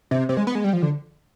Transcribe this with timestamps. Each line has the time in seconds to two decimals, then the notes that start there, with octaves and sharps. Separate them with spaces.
0.11 C3
0.29 C3
0.37 G#3
0.47 B3
0.55 G#3
0.64 G3
0.73 F3
0.82 D3